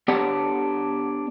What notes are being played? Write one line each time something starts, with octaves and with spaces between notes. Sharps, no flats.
B3 D4 G4 C#5 F#5